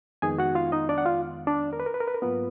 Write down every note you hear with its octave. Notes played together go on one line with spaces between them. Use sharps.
F2 D#3 G#3 B3 D#4 G#4 G#5
F#4 F#5
F4 F5
D#4 D#5
D4 D5
F#5
F4 F5
D4 D5
A#4
B4
A#4
B4
A#4
B4
A#4
G#2 F#3 A#3 B3 F4 B4